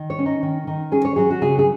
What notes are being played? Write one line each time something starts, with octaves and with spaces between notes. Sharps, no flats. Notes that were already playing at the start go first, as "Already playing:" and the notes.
Already playing: D#3
C#5
C#4
D#4
D#3
D#3
C#4 G#4
C#5
F#3 G#4
F#4
C#3 G#4
G#4